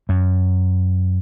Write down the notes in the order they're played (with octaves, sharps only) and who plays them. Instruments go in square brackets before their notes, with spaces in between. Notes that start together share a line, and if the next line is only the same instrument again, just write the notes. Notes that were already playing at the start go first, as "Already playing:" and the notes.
[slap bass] F#2